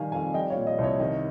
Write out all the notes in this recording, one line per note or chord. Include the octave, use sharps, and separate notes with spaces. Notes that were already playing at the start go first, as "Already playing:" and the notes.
Already playing: D#3 G3 F5 G#5
F2 F5 G#5
G3 D#5 G5
C#5 F5
A#2
D#5
C2
C#5
D#3 D#5